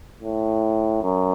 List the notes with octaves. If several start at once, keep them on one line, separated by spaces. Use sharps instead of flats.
A2
F#2